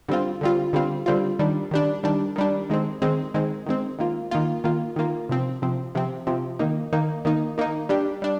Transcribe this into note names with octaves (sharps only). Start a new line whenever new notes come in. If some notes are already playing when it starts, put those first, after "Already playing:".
D3 G3 C4 F4
D3 G3 C4 F4
D3 G3 C4 F4
D3 G3 C4 F4
D#3 G3 D4
D#3 G3 D4
D#3 G3 D4
D#3 G3 D4
D#3 G#3 C4
D#3 G#3 C4
D#3 G#3 C4
D#3 G#3 C4
D#3 A#3 F4
D#3 A#3 F4
D#3 A#3 F4
D#3 A#3 F4
C3 F3 C4
C3 F3 C4
C3 F3 C4
C3 F3 C4
D#3 A#3 D#4
D#3 A#3 D#4
D#3 A#3 D#4
D#3 A#3 D#4
G3 D4 G4
G3 D4